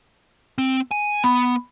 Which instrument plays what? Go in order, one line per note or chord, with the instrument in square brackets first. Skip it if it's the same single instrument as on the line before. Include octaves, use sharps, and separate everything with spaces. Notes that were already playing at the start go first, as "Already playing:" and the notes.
[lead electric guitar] C4
G#5
[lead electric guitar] B3 [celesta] B5